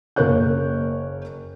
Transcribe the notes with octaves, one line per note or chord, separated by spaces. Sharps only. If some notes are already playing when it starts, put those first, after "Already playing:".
F#1 A#3 A#4 C#5 F#6 G6